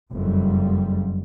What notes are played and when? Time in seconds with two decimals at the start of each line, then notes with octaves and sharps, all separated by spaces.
0.11 F#1 F2 G3